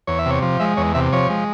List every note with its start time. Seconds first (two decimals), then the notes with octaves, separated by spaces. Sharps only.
0.07 E2 C#5
0.19 E5
0.26 C3 C#5
0.42 F3
0.60 G#3 E5
0.77 E2 C#5
0.95 C3 E5
1.13 F3 C#5
1.30 G#3